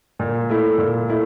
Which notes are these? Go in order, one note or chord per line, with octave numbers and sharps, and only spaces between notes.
A#2
A3 E4
A#2
A3 E4